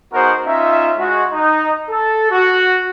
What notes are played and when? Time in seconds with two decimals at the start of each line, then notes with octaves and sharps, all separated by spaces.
0.13 B3 D#4 F#4 G#4 A#4 C5
0.46 C#4 D#4 F4 E5
0.98 G#3 F#4
1.31 D#4
1.89 A4
2.31 F#4